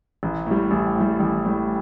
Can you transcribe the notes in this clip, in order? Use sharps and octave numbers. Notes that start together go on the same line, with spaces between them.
A1
A2 G3
A1
A2 G3
A1
A2 G3